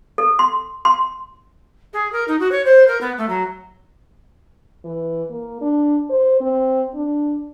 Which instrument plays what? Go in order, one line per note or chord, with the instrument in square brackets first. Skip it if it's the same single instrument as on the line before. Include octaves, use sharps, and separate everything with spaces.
[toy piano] A4
C6
C6
[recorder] G#4
A#4
D#4
F#4
C#5
C5
A#4
B3
A3
F#3
[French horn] E3
A#3
D4
C5
C4
D4